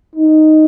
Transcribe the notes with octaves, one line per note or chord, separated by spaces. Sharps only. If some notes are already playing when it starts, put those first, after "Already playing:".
D#4